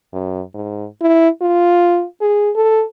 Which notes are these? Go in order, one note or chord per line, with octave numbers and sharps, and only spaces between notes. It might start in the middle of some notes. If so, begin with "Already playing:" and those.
F#2
G#2
E4
F4
G#4
A4